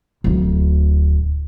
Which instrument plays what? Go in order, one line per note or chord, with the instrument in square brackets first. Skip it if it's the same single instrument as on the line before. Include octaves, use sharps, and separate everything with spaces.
[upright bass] D1 D2